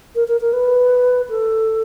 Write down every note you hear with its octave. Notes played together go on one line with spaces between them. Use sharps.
A#4
A#4
A#4
B4
A4